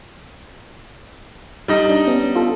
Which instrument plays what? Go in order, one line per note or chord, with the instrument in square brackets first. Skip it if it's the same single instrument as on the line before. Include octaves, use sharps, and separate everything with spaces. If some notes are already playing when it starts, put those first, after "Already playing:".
[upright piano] G3 D#4 D#5
[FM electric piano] D4
B3 C#4
F4 A4